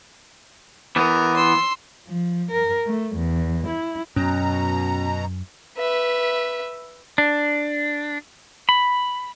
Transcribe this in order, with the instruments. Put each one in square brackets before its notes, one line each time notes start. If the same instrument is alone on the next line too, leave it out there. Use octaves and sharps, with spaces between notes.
[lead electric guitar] E3 B3 [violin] A#4
[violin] C6 E6
[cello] F3
A#4
A3
E2
E4
[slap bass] F#2 [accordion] B2 A#5 [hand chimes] C#4
[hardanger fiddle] B4 E5
[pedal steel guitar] D4
B5